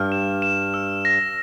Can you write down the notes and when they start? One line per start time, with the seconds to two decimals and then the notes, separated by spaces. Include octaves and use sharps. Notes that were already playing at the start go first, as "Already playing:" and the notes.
Already playing: G2 F6
0.12 E7
0.42 E7
0.74 E6
1.05 A#6